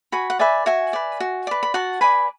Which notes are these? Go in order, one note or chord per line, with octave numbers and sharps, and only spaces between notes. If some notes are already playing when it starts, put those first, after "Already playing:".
F#4 G#5 B5
F#5
B4 D5 E5 G#5
F#4 E5 G#5
B4 D5
F#4
B4 D5
B5
F#4 F#5 A5
B4 D5 G#5 B5